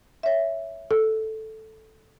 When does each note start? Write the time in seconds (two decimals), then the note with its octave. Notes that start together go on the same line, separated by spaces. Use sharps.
0.23 C#5 E5
0.91 A4